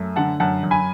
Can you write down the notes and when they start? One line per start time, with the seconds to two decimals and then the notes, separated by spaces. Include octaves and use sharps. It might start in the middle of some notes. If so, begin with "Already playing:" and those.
Already playing: F#2 A3
0.16 D3 F#5 A5
0.40 F#2 F#5 A5
0.63 F#2
0.71 G#5 B5